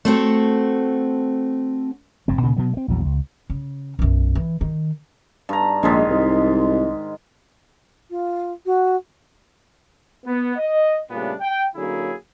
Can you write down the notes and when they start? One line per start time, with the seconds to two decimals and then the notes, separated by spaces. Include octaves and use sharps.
0.05 A3 C4 F#4 A4
2.28 F1 G2 C4
2.42 D2 A#2 C#3
2.56 B2 F#3 B3
2.73 A3 C4
2.88 A#1 E2 F#3
3.05 C#2
3.50 C#3
3.99 B1 F#2
4.35 E3
4.61 D#3
5.49 G2 A#5
5.83 A#1 G#2 D#3 G#3
6.10 C2
8.10 F4
8.65 F#4
10.25 B3
10.57 D#5
11.10 A#2 C#3 G3 A3 B3 D4
11.40 G5
11.75 D3 F#3 A#3 C#4 E4 G#4